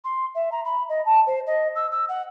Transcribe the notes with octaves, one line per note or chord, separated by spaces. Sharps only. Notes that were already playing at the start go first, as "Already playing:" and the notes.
C6
E5
A#5
B5
D#5
A5
C5
D#5
E6
E6
F#5